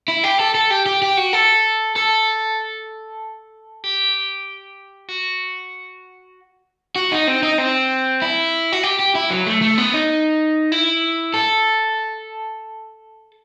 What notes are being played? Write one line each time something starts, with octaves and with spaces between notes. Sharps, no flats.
E4
G4
A4
A4
G4
G4
G4
F#4
A4
A4
G4
F#4
F#4
D#4
C4
D#4
C4
E4
F#4
G4
G4
E4
F#3
A3
A3
B3
D#4
E4
A4